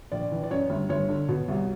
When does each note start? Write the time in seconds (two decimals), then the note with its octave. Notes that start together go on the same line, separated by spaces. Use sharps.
0.12 A#1 D5
0.32 E3
0.43 D5
0.51 F#2 C#5
0.70 G1
0.90 G1 C#5
1.09 D3
1.29 B2
1.48 C2